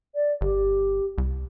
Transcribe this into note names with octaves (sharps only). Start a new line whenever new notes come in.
D5
G1 G4
C2